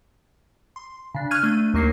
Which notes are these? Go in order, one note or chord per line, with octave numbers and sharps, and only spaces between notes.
C6
C#3 D4
C#6 F6 F#6 G#6 D#7
A3 D4 D#7
D#2 F#3 A#3 D#4 C7